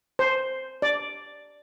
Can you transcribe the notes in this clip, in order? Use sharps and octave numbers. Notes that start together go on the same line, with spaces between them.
C5
D5